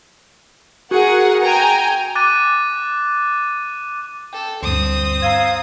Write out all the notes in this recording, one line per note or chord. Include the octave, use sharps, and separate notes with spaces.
F#4 G#4 A#4 F#5
G5 G#5 A#5
D6 F#6 A6 D#7
A4 G5
D2 G2 C4 D#6
F5 A#5 E6 G#6